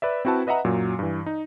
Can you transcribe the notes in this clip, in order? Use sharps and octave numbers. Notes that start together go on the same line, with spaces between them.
B4 D5 E5
C4 E4 F#4 B4 A5
B4 D#5 E5 F#5 A#5
F#2 A#2 F#3
G2 E3
D#4